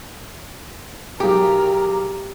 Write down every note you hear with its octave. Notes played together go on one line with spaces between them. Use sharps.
B1 G4 G#4 A#4 D6